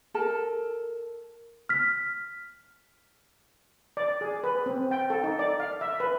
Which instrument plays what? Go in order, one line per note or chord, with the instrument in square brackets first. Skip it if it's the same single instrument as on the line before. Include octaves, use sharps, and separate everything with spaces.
[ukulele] A4 A#4 A5
[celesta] F6 B6
[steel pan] D5
G#4
B4
C4
G5
A4
D#4
D5
F5
E5
B4